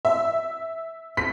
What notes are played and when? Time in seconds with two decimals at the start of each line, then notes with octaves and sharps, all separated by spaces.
0.05 E5
1.17 B6